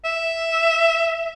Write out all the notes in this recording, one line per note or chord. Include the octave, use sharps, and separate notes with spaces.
E5